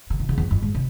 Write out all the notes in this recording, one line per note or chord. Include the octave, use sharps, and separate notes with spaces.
C#3
C3
C#3
E2
F2
G#2
C3